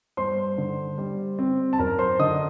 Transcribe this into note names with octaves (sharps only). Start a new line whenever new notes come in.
G2 C5 C6
D3
G3
C4
A5
F#2 A#4 A#5
C5 C6
D3 D#5 D#6